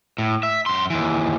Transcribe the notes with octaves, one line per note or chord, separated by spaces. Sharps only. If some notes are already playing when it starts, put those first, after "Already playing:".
A2
E5
F#2 C6
D#2 E3